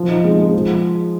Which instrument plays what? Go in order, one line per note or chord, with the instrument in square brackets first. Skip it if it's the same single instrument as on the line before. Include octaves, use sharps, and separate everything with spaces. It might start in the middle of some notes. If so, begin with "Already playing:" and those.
Already playing: [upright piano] F3
D#4
G#3
G#3
F3